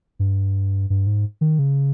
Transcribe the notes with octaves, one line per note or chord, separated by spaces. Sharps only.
G2
G2
G#2
D#3
C#3